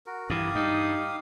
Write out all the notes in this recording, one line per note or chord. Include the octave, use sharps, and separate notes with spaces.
F#4 A#4
G2 E3 G4 F5 D#6
G2 D#4